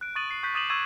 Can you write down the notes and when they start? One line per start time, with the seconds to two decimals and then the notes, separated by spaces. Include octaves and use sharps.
0.01 F#6 D7
0.15 C#6 D#6 A6 D#7 F#7
0.30 A6 C7 D#7
0.43 C#6 F#6 G6 B6
0.54 D6 D#6 A6 D#7 E7 F#7
0.69 C#6 E6 G#6 A6 D#7 E7